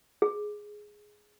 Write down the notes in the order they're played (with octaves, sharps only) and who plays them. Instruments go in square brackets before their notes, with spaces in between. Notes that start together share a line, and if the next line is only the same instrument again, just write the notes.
[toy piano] G#4